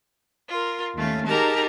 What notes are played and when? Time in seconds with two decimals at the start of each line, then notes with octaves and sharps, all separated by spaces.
0.49 F4 A#4
0.95 D#2 A3 C#4 F5
1.27 D#4 G4 G#4 A#4 A5 A#5